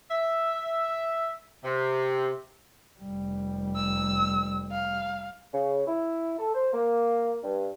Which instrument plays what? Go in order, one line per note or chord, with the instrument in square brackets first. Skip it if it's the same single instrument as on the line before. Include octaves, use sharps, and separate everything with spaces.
[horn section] E5
C3
[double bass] F1 G3
[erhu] E6
F5
[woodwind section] C#3
E4
A4
C5
A#3
G2